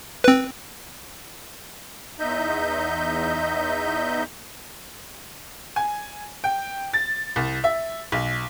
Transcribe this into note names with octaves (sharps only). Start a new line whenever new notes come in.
C4 B4
E2 D#4 D#5 E5 G6
G#5
G5
A6
C2
E5
B1